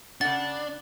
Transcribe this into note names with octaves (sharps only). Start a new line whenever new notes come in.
C#3 D4 F#5 A6